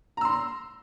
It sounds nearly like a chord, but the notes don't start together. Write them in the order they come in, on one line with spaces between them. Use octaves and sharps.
A#5 E6 C6